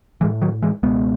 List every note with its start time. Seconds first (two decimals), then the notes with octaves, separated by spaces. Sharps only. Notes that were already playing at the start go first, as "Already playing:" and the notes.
0.21 A1 A2 E3 G#3
0.42 D#3 F#3
0.62 E3 G#3
0.83 C#2 B2 G#3 B3